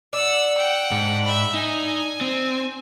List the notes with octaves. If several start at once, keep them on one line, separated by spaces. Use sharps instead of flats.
D5 F#5 E6
F#5 G5
G#2 D4
E5 B5
D#4 G#5
C4